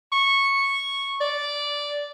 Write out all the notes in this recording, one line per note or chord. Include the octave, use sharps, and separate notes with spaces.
C#6
D5